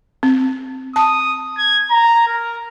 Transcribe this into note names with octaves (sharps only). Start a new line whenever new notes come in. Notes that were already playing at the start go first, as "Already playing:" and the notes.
C4
A5 D#6
G#6
A#5
A#4